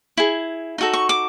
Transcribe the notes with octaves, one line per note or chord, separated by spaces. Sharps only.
E4 G#4
D#4 F#4 A4
C#6
D6